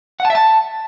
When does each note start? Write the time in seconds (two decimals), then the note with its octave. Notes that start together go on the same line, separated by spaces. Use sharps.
0.20 F#5
0.25 A5
0.30 E5
0.35 A5